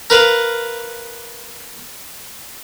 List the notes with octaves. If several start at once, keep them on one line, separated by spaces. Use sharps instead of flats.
A#4 B4 F5